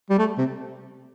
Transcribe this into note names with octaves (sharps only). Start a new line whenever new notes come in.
G3
A3
C3